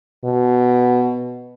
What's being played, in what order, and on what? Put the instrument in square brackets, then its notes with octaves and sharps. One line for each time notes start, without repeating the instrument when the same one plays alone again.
[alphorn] B2